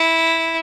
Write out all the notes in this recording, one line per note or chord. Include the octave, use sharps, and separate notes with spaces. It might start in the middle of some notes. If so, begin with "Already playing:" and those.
Already playing: E4